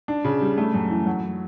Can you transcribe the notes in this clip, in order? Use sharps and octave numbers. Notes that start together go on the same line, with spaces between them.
D4
C#3
G3
A3
F#2
E3
F#3